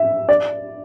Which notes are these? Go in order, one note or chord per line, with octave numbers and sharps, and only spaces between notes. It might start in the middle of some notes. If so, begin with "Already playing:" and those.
Already playing: E5
D5